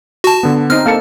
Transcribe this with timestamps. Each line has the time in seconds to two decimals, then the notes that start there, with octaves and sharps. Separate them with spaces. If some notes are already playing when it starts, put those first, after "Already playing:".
0.24 F#4 A5
0.43 D3 B3
0.70 C4 D#4 F6
0.86 A#3 A4 F5 A5 C#7